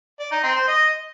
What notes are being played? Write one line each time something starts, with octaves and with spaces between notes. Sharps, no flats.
D5
D#4
C4
C5
D#5